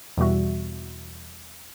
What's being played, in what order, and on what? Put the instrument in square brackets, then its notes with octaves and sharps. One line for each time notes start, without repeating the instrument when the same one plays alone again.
[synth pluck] E2 B2 G3 F#4 E5